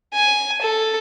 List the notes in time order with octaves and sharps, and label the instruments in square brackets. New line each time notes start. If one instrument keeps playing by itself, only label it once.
[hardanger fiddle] G#5
A4